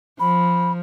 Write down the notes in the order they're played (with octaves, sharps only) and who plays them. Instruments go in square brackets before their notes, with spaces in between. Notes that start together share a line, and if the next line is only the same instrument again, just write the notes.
[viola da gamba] F3 [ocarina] B5